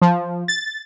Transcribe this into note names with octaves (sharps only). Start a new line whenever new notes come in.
F3
A6